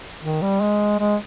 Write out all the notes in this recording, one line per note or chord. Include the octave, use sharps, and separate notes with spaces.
D#3
G3
G#3
G#3